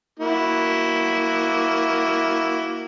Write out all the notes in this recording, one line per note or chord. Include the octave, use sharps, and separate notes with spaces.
A#3 E4 F#4